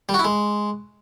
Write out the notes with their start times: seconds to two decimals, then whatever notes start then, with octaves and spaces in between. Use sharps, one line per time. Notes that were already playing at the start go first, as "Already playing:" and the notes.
0.09 G3
0.14 F#4
0.19 E4
0.24 G#3